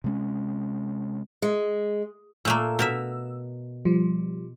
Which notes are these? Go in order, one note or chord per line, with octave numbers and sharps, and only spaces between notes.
C3 G#3 C#4
G#3
A#2 A3 A#3 E6
B2 A#4 E5
F3 G3